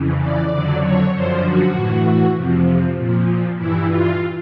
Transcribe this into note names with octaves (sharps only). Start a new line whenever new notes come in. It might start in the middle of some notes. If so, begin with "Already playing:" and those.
Already playing: F2 C#3 E3
D5
F2 D3 F#3
C#5
F#2 D3 F3 C5
F#4
A2 E3
F2 C3 F3
A#2 F3
G2 E3 E4
F4